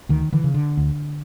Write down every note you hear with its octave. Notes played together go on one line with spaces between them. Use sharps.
D2 D#3
D3 E3
C#3
D3
D2